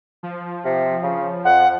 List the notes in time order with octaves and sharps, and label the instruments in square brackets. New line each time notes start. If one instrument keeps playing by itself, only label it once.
[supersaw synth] F3
[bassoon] C3
C#3
[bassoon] F2 [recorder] F#5